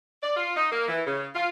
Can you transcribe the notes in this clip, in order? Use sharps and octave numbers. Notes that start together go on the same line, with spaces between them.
D5
F4
D#4
A#3
E3
C#3
F4